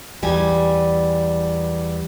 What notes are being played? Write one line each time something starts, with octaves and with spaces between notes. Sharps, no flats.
E2 G3 G#5